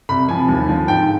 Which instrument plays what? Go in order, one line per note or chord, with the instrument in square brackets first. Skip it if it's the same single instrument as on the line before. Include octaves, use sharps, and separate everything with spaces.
[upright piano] C2 B5
C3 F3 G#5
D#2
D3 F3
G#2 G5